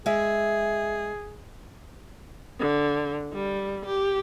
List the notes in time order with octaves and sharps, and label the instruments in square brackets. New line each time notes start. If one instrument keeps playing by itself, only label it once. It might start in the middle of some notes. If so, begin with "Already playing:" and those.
[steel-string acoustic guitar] G#3 E5 [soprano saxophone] G#4
[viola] D3
G3
G4